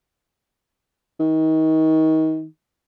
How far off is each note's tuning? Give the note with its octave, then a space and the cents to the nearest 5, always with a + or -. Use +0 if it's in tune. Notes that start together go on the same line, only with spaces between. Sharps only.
D#3 +30